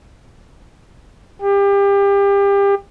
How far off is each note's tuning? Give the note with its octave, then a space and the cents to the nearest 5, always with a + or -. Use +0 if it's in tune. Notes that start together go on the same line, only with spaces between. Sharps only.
G4 +30